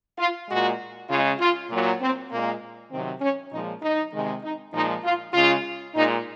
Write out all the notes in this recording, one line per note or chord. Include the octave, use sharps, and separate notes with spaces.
F4
A#2 G#3 F#4
C#3 G#3 F4
F4
A#2 F#3
C4
A#2 G#3 A#3
C3 D#3 F#3 C4
C#4
A#2 F3 G#3 D#4
D#4
C3 D#3 G#3
D#4
A#2 F3 G#3 D#4
F4
C#3 G#3 F4
A#2 G#3 D#4